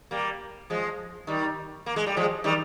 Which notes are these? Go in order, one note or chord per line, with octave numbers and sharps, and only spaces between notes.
G3 A#3
F3 G#3
D#3 G3
A#3
G#3
G3
F3 G#3
D#3 G3